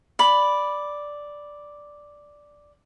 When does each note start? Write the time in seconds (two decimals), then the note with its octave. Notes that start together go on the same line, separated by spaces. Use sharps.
0.19 D5 B5